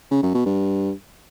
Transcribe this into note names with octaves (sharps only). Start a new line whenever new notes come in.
C#3
F#2
B2
G2